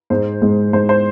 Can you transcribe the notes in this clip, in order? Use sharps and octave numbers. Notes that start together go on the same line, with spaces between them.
G#2 G#3 C5
G#2 G#3
G#2 G#3 C5
C5